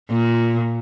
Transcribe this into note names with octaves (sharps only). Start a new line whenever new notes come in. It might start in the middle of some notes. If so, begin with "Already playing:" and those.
A#2